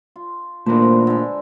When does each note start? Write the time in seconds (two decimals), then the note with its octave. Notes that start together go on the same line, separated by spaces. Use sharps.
0.16 F4
0.66 A#2 A3 A#3 D4 B4 C5
1.07 D3 G#3